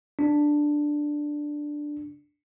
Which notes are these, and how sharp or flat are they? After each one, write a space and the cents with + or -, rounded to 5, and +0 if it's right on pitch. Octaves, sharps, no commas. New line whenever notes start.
D4 +5